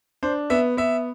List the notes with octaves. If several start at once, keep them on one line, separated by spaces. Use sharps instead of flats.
D4 C5
B3 E5
B3 E5